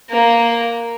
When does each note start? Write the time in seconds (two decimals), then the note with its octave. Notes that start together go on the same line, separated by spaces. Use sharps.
0.10 A#3